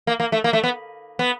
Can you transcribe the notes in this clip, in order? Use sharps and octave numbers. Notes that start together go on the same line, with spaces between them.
A#3
A#3
A3
A#3
A3
B3
B3